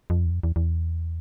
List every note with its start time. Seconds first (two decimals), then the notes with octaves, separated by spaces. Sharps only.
0.10 F2
0.25 E2
0.30 F2
0.43 E2
0.56 E2